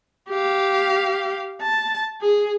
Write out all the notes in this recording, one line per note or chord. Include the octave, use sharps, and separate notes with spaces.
G4 F5
A5
G#4